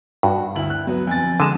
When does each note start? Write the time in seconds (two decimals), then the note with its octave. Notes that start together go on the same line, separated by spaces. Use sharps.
0.23 G2 F#4
0.56 D2 E4 F#7
0.70 F#6
0.87 F#3 B3
1.07 F2 G#5 A6
1.40 D3 G#3 A#5 D#7 E7